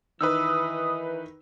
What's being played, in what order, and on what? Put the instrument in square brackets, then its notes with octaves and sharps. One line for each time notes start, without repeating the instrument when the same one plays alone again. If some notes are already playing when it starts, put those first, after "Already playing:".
[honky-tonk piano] D#3 D#4 B4 [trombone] E3 [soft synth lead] D#6 [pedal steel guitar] E6